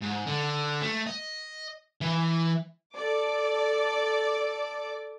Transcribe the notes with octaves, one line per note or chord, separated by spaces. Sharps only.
G#2
D3
A3
D#5
E3
A4 D5 D6